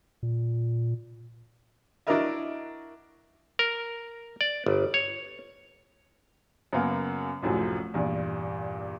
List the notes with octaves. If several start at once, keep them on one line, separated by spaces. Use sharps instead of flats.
A#2
D4 E4 F#4 A#4 D#5 E5
A#4
D5
G1
C#5
F#2 C#3 F#3 A#3 B3
C2 F#2 A2 F3 F#3
E2 G2 A#2